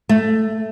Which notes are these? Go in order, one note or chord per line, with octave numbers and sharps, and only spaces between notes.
A3